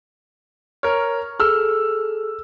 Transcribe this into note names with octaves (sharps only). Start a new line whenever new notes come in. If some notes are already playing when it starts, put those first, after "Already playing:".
A#4 C#5 F6
G#4 A4 E6 F6